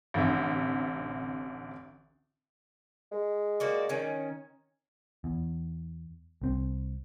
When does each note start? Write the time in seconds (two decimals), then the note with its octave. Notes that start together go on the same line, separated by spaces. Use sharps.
0.14 A1 D2 C3 E5
3.12 G#3
3.60 A#3 F#4 D5
3.89 D#3 C#4
5.24 E2
6.42 C2 C4